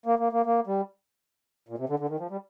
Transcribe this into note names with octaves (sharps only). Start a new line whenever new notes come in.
A#3
A#3
A#3
A#3
G3
A#2
C3
D3
D3
D#3
F3
G3